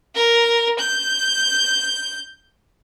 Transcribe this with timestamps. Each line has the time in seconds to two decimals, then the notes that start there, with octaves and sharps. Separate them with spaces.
0.16 A#4
0.79 G6